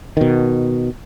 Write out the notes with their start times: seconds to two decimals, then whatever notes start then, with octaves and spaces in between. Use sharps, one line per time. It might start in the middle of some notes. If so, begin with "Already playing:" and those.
0.17 B2 D#3